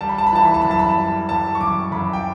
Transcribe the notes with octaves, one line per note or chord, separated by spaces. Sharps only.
G3 A5
B5
A5
B5
E3 A5
B5
A5
F#2 B5
A5
B5
A5
G3
G3 A5
C#6
F#2 D6
F#2 B5
G5